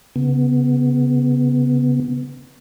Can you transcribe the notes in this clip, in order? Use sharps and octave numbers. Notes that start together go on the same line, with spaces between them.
C#3 B3